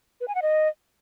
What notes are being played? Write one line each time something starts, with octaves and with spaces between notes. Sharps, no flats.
B4
G#5
F#5
D#5